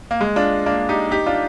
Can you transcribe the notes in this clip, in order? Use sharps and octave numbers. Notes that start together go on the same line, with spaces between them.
A#3
G#3
D4 F4
A#3 D4
D#4 G4
D#4 G4
D4 F4